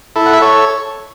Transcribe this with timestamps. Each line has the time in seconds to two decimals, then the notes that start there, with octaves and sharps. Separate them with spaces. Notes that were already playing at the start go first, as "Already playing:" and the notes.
0.16 E4 A4
0.26 F#5
0.33 E5
0.41 A4 C#5